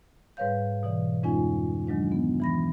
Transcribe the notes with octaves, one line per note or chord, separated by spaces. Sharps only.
G#2 G3 B4 C#5 F5 G6
B2 E3 D5
F2 G#3 C#4 D#4 F4 G#5
D#3 F#3 G#3 D4
B3
E3 B5 A#6